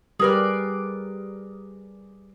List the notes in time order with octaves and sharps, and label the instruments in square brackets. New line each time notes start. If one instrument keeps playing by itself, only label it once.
[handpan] G3 G4 B4 [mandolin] G#4 A#4 D5